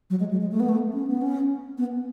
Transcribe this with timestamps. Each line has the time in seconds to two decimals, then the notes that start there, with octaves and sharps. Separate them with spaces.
0.10 F#3
0.20 G#3
0.31 F#3
0.41 G#3
0.52 A3
0.60 B3
0.69 A3
0.93 C#4
1.07 B3
1.22 C#4
1.78 B3